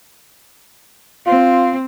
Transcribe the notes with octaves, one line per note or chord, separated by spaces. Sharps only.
C4 F4